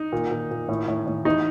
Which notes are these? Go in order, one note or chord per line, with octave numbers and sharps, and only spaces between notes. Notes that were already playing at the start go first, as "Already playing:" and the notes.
Already playing: D#4
A#2
A#2
A#2
A2
A2
A2
E3 D#4